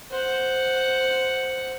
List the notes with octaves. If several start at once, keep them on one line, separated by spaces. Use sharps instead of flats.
C5 F#5